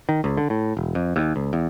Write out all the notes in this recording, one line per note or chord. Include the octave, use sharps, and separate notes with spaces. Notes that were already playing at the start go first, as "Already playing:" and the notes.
D#3
C#2
D3
A2
E1
F2
D#2
C#2
E2